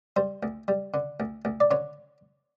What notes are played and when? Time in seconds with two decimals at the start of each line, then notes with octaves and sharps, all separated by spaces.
0.16 G3 C5
0.43 D2
0.68 G3
0.94 D3
1.20 D2
1.45 D2
1.60 D5
1.71 D3 C#5